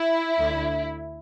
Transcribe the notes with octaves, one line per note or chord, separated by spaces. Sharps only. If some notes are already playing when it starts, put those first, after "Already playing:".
Already playing: E4
D2 D3